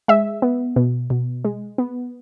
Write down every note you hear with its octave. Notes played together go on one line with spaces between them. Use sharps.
G#3 E5
B3
B2
B2
G#3
B3